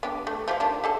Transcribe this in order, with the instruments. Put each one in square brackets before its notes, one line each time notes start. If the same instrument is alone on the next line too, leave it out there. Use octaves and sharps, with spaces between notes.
[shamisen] B3 D4 G4
A3
F3 G4 F5
D#3 D4 A5
G4 A4 A5